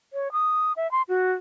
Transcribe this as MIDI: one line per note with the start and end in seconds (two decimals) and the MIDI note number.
0.13 0.32 73
0.32 0.72 87
0.76 0.90 76
0.91 1.02 84
1.09 1.32 66